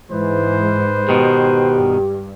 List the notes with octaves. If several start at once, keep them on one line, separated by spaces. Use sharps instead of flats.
G#2 E3 B4 C5
B2 D#3 G4
G2